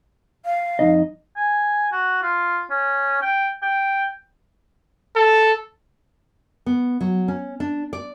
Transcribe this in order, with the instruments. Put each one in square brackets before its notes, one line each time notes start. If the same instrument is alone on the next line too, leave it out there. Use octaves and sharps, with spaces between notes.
[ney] F5
[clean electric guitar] F2 D#4 D#5
[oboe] G#5
F#4
F4
C#4
G5
G5
[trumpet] A4
[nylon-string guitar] B3
F#3
C#4
D4
D5